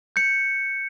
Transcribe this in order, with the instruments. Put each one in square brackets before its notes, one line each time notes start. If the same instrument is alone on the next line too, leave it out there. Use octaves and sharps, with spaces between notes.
[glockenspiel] G6 C#7